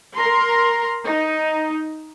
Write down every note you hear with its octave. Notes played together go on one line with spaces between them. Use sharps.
A#4 A#5 C6
D#4